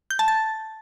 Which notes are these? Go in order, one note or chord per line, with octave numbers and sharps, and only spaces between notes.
G6
A5
A6